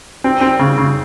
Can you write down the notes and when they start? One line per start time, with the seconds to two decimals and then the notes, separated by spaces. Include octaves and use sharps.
0.24 C4
0.41 C4
0.59 C#3
0.78 C#3